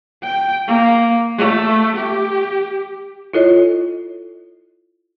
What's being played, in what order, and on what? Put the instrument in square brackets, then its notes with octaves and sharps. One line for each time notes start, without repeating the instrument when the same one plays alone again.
[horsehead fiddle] G5
A#3
A3
G4
[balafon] E4 F4 A4 C#5 D#5